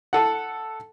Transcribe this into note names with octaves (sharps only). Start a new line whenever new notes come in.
A4 F#5